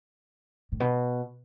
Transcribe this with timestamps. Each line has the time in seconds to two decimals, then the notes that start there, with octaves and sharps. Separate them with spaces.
0.72 A2
0.80 B2